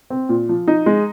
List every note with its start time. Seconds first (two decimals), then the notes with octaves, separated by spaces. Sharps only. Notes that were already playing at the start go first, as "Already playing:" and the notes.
0.10 C4
0.29 A#2
0.49 F3
0.68 D#4
0.86 G#3